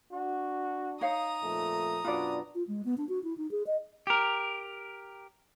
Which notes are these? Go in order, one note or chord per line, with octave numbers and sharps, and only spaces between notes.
D4 F#4
D#4 C#5 F5 A#5 D#6
F2 A#2 A3
F#2 B2 D4 F4 B4 D5
F4
G#3
B3
D4
F#4
E4
D#4
G#4
D#5
G4 A#4